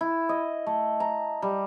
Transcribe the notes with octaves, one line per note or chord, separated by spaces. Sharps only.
E4
D#5
A3
A#5
G3